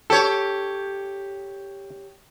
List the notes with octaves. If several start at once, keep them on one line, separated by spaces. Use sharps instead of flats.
G4 A4 C#5